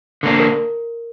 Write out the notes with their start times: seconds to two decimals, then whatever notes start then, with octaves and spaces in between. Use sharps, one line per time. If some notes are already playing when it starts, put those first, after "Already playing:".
0.23 D3 A#3 D4
0.40 A#4